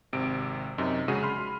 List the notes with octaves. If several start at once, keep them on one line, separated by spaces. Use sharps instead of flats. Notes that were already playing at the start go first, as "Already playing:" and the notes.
G#1 C3 D7
F#2 C3 D#4
A#1 C#3 G#3 F#4 G#4 D#7
B5 C6 F6